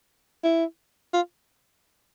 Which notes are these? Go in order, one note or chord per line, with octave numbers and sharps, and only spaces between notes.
E4
F4